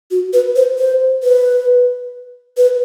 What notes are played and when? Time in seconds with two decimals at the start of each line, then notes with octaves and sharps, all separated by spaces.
0.11 F#4
0.33 B4
0.56 C5
0.78 C5
1.23 B4
2.57 B4